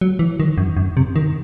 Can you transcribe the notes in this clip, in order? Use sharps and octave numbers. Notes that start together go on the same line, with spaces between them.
F#3
E3
D#3
F#2
F#2
C3
D#3